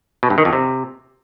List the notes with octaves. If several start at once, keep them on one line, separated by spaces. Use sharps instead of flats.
B2
G2
D#3
F2
C3